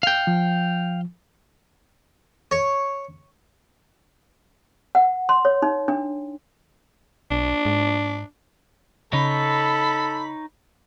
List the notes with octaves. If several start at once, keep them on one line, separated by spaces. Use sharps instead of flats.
F5 G5
F3
C#5
F#5
C6
C#5
D#4
D4
B1 D4
G#2
C#3 D#4 A4 C#5 B5